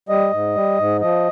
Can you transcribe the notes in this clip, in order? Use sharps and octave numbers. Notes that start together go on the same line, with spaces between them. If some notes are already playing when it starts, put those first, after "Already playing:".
G3 D#5
G#2
G3
G#2
F3 D#5